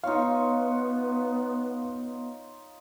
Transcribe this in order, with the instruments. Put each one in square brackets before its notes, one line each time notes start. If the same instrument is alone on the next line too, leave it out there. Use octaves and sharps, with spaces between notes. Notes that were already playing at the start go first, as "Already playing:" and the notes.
[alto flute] B3 [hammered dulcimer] D#4 F4 C#5 [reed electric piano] F5